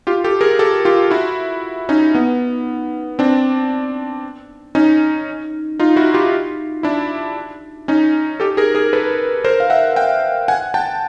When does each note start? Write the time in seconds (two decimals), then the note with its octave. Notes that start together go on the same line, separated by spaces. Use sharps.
0.07 F4 G4
0.24 G4 A4
0.41 G#4 A#4
0.59 G4 A4
0.85 F4 G4
1.10 E4 F#4
1.89 C#4 D#4
2.15 B3
3.19 C4 D4
4.75 C#4 D#4
5.79 D#4 F4
5.96 E4 F#4
6.14 F4 G4
6.83 D4 E4
7.88 C#4 D#4
8.40 G4 A4
8.57 G#4 A#4
8.75 G#4 A#4
8.93 A4 B4
9.44 A#4 C5
9.60 F5
9.70 E5 F#5
9.96 F5 G5
10.48 F#5 G#5
10.74 G5 A5